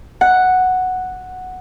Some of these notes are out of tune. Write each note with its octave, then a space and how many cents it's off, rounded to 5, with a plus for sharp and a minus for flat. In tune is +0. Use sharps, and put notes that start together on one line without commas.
F#5 +0